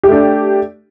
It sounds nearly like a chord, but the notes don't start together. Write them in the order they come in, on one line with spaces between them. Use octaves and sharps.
G4 A3 D4